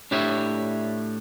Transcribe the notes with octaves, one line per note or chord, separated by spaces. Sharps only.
A2 D4 G4 C#5 D5 E5